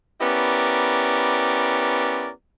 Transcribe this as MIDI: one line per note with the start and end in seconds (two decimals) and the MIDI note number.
0.21 2.30 59
0.21 2.30 61
0.21 2.30 64
0.21 2.30 67
0.21 2.30 70
0.21 2.30 74